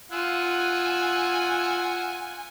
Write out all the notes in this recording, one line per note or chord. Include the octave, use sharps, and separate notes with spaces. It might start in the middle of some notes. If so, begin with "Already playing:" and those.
F4 F#5 G#5 E6 F#6